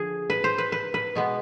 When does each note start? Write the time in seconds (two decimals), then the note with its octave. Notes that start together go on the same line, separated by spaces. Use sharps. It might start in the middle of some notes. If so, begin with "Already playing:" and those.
Already playing: D3 F3 G#4
0.30 B4
0.44 C5
0.58 B4
0.72 B4
0.94 B4
1.15 B2 G#3 B3